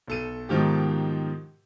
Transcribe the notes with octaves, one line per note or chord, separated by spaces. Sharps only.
B1 A4 D#7
G#2 B2 D#3 F3 G4